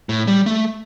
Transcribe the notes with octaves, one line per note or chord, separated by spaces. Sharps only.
A2
G3
A3